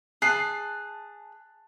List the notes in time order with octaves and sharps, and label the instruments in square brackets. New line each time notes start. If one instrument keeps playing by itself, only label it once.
[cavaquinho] G#4 [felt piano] A5 F#6 C7